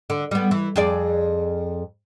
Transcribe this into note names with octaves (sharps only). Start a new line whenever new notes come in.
D3
G3 B3
E3
F2 G#4 D5